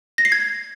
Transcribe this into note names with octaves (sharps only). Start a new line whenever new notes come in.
A#6
C7
G#6